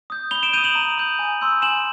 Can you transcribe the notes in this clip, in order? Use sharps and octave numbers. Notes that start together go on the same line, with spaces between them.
D#6 G6
B5 F7 G7
D7 E7
D#6 G6 D#7 F7
E7 F#7
A#5
D#6 G6
G#5
C6 E6 G6
G#5 E7 F#7